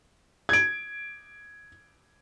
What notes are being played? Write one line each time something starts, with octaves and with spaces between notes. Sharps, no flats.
G#6 D7